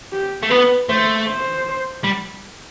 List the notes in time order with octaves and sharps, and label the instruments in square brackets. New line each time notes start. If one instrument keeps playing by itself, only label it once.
[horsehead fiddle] G4
[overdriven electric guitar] A3
[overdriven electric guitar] B3 [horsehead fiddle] B4
[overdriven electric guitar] A3 [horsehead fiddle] C5
[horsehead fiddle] C5
[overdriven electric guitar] G3